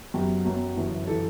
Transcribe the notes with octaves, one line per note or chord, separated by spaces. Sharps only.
F#2 F#3 B3 G4
F#2 F#3 B3
G1 F#2 E3
E3 A4